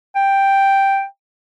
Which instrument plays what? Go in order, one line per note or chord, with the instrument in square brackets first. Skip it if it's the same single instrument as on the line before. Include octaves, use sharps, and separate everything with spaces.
[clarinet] G5